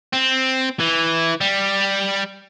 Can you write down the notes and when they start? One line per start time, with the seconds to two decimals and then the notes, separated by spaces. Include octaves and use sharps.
0.13 C4
0.80 E3
1.41 G3